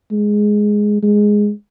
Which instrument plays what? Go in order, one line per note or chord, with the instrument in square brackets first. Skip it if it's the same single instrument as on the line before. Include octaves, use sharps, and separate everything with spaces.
[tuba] G#3
G#3